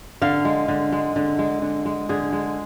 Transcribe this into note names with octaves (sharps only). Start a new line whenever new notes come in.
D3 F5
G#3
D3
G#3
D3
G#3
D3
G#3
D3 G#4
G#3